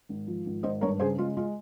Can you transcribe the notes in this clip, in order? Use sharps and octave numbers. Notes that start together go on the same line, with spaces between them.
G#1
F3
G#1
G#1 C5 D#5
G2 A#4 C#5
C#3 G#4 C5
G#3 F4
G#3 F4